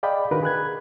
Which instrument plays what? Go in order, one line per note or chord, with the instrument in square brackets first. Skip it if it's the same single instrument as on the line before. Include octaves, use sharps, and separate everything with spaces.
[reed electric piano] G#4 D5 D#5 F5 G5 B5
D#3 D4 F#4 A#4 B4
G#4 B5 F#6 G#6